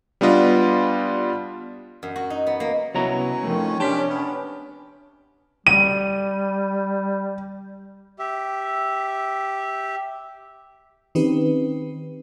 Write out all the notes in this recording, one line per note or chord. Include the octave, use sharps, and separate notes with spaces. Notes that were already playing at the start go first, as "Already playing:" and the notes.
G3 B3 D4 F4 D#5
F#2
F#4
D#4
B3
A#3
C2 F#3 B3 C#4 E4 C#5 A#5
F2 D#3 F3 A3
C3 C#4 D4 G4 A5 C6 B6
B3
G3 D#7
G4 E5
D#3 C4 C#4 D#4 G4 B4